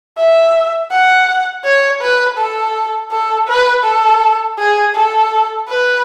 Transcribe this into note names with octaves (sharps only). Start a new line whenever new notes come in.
E5
F#5
C#5
B4
A4
A4
B4
A4
G#4
A4
B4